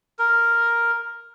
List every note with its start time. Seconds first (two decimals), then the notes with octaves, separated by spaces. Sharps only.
0.19 A#4